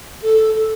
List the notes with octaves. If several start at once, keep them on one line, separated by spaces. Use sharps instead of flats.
A4